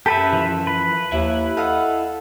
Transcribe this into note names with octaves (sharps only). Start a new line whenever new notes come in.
F#2 G4 A4 B4 E5
E3 F3
B4
D#2 E4 E5
A4 D#5 F5 F#5